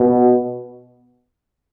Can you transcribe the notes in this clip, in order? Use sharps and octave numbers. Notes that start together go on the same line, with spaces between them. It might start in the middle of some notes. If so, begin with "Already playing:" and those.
Already playing: B2